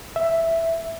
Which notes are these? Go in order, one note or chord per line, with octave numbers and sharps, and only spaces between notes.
E5